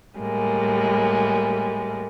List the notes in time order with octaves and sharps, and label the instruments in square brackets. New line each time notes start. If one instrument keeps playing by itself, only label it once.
[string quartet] A2 G3 G#3 A#3